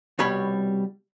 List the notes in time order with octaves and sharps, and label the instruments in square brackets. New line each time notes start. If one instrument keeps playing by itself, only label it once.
[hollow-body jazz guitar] C2 B2 G3 C#5 B5